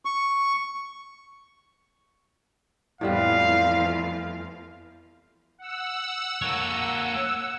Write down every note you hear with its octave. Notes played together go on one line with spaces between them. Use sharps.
C#6
F2 A2 E3 F3 G3 B3 F5
F#5 E6
A#3 C#5